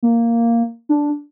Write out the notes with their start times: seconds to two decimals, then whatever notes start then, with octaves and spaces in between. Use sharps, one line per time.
0.03 A#3
0.89 D4